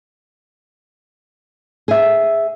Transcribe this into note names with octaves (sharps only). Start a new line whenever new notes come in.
G#4 E5